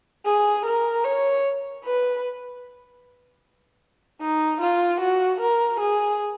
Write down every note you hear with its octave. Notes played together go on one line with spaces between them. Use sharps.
G#4
A#4
C#5
B4
D#4
F4
F#4
A#4
G#4